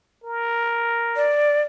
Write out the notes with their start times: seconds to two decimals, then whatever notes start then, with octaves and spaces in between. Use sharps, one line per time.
0.24 A#4
1.16 D5